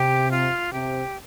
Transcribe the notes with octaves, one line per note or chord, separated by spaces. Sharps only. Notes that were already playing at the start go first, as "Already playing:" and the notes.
Already playing: C3 G4
F4
C3 G4